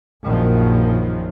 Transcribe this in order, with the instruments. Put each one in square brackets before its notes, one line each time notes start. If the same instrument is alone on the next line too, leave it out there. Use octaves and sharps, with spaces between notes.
[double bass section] A#1 F#2 A#2 D#3 F3 F#3